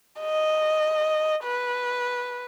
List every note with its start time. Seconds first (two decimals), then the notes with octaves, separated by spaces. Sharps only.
0.20 D#5
1.44 B4